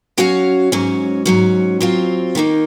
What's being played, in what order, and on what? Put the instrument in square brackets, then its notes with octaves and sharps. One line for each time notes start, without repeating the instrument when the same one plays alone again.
[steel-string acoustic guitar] F#3 C#4 F#4 C#5 F5
G#2 F#3 C#4
G#2 F#3 C#4
F#3 C4 F4
D#3 A#3 D#4